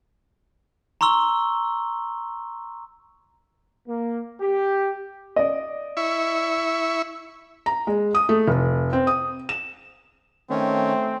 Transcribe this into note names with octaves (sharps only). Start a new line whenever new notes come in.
A#5 C6 C#6 E6 G7
A#3
G4
D5 D#5
E4 E5 C#6
A#5
G#3
D#6
A3
F1
C4
D#6
E7
D#3 A3 C4 C#4